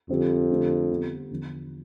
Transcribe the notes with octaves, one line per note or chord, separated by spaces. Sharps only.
F2 D3 G3 C4 G4
D3 A3 D4 G4
D3 G3 B3
E2 D3 F3